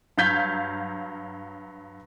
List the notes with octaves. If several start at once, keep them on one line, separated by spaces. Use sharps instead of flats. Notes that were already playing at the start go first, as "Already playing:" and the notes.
G2 F#3 F5 G6 G#6 B6